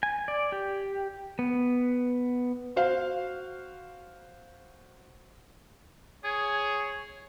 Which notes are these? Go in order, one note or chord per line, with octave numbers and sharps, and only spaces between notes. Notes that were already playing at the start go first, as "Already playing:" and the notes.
G#5
D5
G4
B3
F#4 C5 F5
G#4 C#5